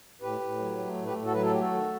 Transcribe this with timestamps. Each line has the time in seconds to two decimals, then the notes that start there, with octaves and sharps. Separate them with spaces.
0.22 A2 G4 B4
0.40 A2
0.59 F#3
0.78 A3
0.96 A2
1.05 G4 B4
1.15 A2
1.24 F#4 A4
1.33 F#3 B4
1.43 A4
1.51 A3 G4
1.60 F#4 A4
1.71 D#3